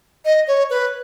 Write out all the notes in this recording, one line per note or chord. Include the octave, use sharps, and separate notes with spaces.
D#5
C#5
B4